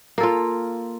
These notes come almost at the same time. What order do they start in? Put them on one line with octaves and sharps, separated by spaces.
A#3 A4 F4